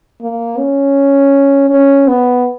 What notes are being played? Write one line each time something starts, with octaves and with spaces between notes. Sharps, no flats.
A#3
C#4
C#4
B3